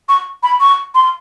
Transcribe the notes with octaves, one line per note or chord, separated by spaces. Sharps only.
C#6
B5
C#6
C6